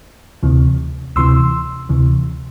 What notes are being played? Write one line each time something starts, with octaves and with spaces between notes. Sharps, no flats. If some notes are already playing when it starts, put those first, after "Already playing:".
D2 C3 E3
D2 C3 E3 C6 E6
D2 C3 E3